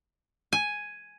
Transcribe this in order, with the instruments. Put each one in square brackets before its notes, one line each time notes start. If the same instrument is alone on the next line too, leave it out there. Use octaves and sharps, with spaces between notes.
[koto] G#5